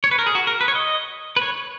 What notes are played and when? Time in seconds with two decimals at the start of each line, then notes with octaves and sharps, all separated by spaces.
0.04 C#5
0.11 B4
0.19 A#4
0.27 G#4
0.35 F#4
0.47 A#4
0.61 B4
0.68 C#5
0.75 D#5
1.36 B4
1.42 C#5